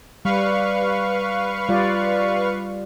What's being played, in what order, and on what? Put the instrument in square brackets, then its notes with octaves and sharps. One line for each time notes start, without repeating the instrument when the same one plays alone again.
[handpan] G3 [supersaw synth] B4 F5 C#6
[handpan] G3 F4 D5